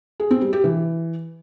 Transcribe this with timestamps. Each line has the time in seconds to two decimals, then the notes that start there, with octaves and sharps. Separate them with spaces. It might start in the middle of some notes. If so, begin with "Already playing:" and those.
0.20 G#4
0.31 C4
0.42 G3
0.53 G4
0.64 E3